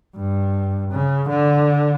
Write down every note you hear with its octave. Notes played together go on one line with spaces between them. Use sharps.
G2
C#3
D3